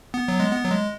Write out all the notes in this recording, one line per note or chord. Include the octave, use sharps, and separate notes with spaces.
B3
F#3
G#3
B3
F#3
G#3